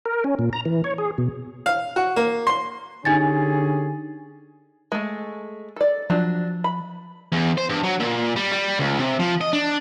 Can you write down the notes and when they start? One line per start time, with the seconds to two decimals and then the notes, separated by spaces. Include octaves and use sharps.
0.06 A#4
0.24 C#4
0.39 A#2
0.53 A#5
0.65 E3
0.84 C#5
0.98 G#4
1.18 B2
1.66 F5
1.96 F#4
2.16 A#3
2.47 C6
3.05 D3 C#4 D#4 G4 G#4 G#5 A6
4.92 G#3 A3
5.76 A4 D5
6.10 F3 F#3 D4
6.64 B5
7.32 E2
7.57 C5
7.69 G2
7.83 F#3
8.00 A#2
8.36 G3
8.52 G3
8.79 C#2
8.99 C3
9.19 F3
9.41 D#5
9.53 D4